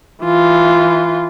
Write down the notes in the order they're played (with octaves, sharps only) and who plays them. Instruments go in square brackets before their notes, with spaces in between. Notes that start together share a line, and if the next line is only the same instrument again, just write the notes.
[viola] E3 F4